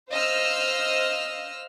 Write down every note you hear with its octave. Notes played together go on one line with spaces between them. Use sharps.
C5 D#5 F5 E6 F6